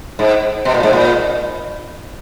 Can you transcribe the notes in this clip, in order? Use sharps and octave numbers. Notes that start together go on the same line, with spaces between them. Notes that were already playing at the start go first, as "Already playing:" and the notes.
G#2
B2
A#2
G#2
A#2